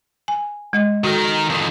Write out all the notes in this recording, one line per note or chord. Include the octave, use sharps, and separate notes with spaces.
G#5
G#3 D#5
D#3 F#4 A4 A#4
F2 D#3